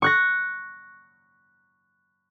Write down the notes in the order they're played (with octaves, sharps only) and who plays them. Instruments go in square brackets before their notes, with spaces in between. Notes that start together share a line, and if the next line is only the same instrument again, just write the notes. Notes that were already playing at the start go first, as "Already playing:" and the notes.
[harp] C#6 F#6 A#6